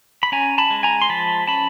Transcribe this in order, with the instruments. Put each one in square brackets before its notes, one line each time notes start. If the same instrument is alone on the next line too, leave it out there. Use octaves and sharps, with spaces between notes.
[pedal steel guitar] B5
C#4 G#5 A#5
A5 B5
G#3
G#5 A#5
C6
F3 A5 B5
C#4 A5 B5